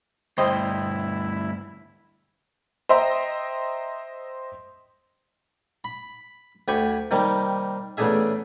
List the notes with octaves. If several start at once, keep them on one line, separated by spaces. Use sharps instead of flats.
D2 G2 E4 C5 D#5 G5 C6
C5 D#5 E5 G5 A#5 C6
B5
D2 G4 G#5 B5 C#6
C3 D#3 G3 A#3
E2 C#3 A3 D4 G#4 E5